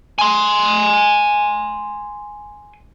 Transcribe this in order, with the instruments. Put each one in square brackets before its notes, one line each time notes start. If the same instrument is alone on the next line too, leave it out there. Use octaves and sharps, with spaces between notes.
[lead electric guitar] G#5 C6